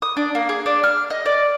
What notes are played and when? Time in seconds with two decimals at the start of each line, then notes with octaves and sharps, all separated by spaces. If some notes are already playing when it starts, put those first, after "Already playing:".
0.02 D#6
0.17 D4
0.35 A#3
0.49 G#4
0.66 D4
0.83 F6
1.10 D#5
1.26 D5